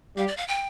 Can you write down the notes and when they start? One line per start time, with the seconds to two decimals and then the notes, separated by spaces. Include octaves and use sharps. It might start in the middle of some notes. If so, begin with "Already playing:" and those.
0.17 G3 G4 F5
0.28 D5
0.37 F5
0.48 G5